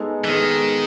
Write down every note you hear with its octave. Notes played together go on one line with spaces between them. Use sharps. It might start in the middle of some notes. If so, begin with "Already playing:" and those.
Already playing: G#3 B3 D#4 A4
E3
D#3 G#3 B3 D#4 A4